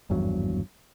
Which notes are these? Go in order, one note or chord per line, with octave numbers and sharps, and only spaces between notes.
G#1 E2 G2 F#3